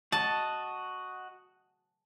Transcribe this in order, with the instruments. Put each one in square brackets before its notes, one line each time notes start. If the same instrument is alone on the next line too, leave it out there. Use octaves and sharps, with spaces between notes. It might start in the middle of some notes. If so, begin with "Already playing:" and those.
[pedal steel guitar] F#4 D#5 F#5 [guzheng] A5